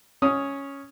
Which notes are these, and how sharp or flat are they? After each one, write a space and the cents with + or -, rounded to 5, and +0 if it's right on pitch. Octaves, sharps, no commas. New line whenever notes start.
C#4 +0 C#5 +0 D#6 +5